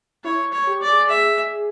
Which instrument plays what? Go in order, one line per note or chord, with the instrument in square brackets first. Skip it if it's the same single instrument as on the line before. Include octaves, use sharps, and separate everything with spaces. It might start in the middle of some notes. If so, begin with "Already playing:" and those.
[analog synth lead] E4 [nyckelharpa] C#5
[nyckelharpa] C#5
[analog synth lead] G4
[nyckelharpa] D5
[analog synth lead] G#4
[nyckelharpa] E5